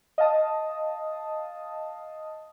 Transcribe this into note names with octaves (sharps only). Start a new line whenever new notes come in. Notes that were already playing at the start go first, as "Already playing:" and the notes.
D#5 F5 A5 D#6